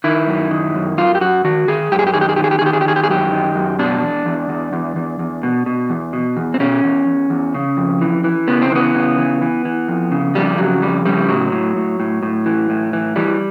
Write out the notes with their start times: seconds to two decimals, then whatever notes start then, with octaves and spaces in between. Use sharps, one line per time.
0.04 D#3 E4
0.28 F#2
0.51 D#3
0.74 F#2
0.97 F#2 F4
1.15 G4
1.21 F#2 F#4
1.44 D#3 F#4
1.68 D#3 G#4
1.92 F#2 G4
1.99 G#4
2.07 G4
2.14 D#3 G#4
2.21 G4
2.29 G#4
2.36 D#3 G4
2.44 G#4
2.51 G4
2.59 G#4
2.61 D#3 G4
2.73 G#4
2.81 G4
2.85 D#3 G#4
2.96 G4
3.04 G#4
3.09 F#2 G4
3.32 D#3
3.55 F#2
3.79 B2 D4
4.02 E2
4.26 E2
4.49 E2
4.73 E2
4.96 E2
5.19 E2
5.43 B2
5.66 B2
5.90 E2
6.13 B2
6.37 E2
6.54 C4
6.60 B2 C#4
6.84 E2
7.07 E2
7.30 E2
7.54 C#3
7.77 F2
8.01 E3
8.24 E3
8.48 C#3 B3
8.62 C4
8.72 E3 B3
8.95 C#3
9.18 E3
9.42 E3
9.65 E3
9.88 F2
10.11 C#3
10.35 F2 G3
10.58 C#3 F#3
10.82 F2 G3
11.05 C#3 G3
11.29 A2 F#3
11.52 A2
11.76 A2
12.00 A2
12.23 A2
12.46 E3
12.70 A2
12.93 E3
13.16 E3 G3